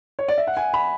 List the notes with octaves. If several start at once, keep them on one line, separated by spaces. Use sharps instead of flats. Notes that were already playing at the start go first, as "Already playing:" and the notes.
C#5
D5
E5
F#5
G#5
B5